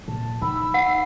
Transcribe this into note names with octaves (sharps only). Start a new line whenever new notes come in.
A#2 A5
D#4 B5 E6
F#5 C7